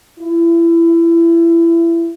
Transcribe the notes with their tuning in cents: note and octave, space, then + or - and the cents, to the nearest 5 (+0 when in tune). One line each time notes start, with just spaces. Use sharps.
E4 +25